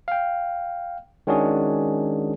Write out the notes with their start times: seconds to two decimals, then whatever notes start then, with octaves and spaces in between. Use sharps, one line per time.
0.08 F5 G5
1.27 D#3 G#3 C#4 D4 F#4 G#4